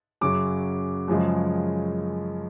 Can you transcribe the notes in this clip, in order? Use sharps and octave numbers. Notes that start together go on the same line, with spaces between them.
F#2 C#3 F#3 D6
F#2 C#3 F3 G#3